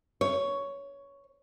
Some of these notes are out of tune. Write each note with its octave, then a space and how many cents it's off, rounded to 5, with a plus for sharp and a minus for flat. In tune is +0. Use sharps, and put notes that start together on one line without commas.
C#5 +10